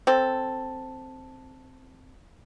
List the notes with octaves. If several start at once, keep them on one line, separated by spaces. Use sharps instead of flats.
C4 A4